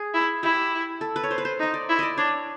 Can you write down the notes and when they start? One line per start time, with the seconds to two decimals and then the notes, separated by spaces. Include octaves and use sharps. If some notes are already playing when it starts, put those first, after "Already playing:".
Already playing: G#4
0.14 E4
0.43 E4 G4
1.01 A4
1.16 B4
1.24 C#5
1.31 C5
1.38 B4
1.45 C5
1.59 D#4
1.63 D#5
1.74 D5
1.89 E4
1.99 D5 D#5
2.17 D4 C#5